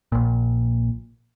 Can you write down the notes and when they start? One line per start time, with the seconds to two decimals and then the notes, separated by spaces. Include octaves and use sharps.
0.12 A#1 A#2